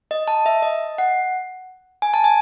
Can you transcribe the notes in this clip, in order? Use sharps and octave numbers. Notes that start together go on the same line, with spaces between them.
D#5
A5
E5
D#5
F#5
G#5
A5
G#5